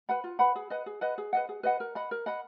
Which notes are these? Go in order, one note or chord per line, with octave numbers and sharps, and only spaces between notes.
B4 F#5 B5
F4
B4 F#5 B5
G#4
B4 D#5 F#5
G#4
B4 D#5 F#5
G#4
B4 D#5 F#5
G#4
B4 D#5 F#5
A#4
D#5 F#5 B5
A#4
D#5 F#5 B5